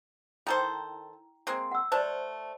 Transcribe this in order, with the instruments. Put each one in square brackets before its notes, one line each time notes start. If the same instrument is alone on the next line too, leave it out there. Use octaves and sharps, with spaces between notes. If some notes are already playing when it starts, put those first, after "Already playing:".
[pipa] D#3 A4 C5 [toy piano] E4 G5 A#5
[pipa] G#3 A#3 C4
[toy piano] F#5 E6
[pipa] A3 A5 [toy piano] C5 D5 C6